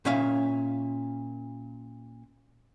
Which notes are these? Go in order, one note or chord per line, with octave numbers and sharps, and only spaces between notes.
A#2 C#4 E5 F5